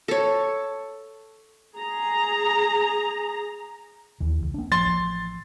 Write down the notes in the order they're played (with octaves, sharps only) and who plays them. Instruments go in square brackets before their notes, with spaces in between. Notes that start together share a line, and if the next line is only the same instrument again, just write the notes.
[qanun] A4 C#5
[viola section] G#4 A#5
[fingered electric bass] D#2 E3
C#2
A#3 D4
[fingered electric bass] A1 F3 [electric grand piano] C6 A6